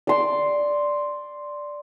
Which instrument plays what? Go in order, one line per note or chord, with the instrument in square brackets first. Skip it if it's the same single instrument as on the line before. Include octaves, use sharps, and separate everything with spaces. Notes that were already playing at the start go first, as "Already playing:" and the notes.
[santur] D5 C6